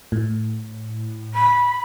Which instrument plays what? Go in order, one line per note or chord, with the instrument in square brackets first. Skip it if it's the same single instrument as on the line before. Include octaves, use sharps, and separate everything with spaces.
[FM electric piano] A2
[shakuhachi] B5